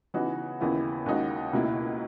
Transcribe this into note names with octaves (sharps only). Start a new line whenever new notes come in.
C#3 E3 B3 D#4 F#4
D#2 C#3 E3 B3 E4
D#2 C#3 G#3 D#4 F#4
C#2 B2 A#3 E4